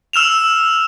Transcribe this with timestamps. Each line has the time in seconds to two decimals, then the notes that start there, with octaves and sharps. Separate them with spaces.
0.13 E6 F6 E7 F7